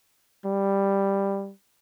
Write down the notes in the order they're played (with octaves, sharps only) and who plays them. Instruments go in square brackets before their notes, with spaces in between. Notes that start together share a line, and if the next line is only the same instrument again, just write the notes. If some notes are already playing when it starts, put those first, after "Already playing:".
[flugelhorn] G3